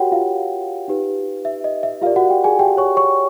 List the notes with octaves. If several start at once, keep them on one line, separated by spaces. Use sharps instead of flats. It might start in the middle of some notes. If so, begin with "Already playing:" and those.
Already playing: F#4 G4 A#4 C#5 F#5 G5
F4 F5
D#4 G4 B4
E5
D#5
E5
F4 G4 A#4 D5 F5
F#4 F#5
G4 G5
G#4 G#5
G4 G5
C#5 C#6
C#5 C#6